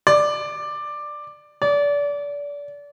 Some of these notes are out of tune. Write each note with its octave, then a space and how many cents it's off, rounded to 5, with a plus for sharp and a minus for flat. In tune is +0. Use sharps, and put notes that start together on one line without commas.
D5 +10
D5 -30